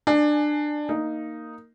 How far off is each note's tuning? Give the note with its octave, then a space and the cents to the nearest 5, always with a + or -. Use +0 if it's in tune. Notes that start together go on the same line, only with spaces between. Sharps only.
D4 +20 G#5 +20
A#3 -15 D#4 +0